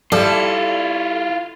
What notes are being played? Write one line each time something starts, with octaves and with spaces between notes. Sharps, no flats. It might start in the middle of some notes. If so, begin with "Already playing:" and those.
G3 E4 F4 A4 D5